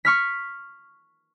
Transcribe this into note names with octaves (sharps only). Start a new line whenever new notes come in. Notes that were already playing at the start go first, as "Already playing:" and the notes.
C#6 F6 B6